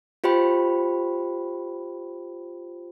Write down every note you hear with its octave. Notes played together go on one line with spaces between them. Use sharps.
F4 G4 C5 G5 B5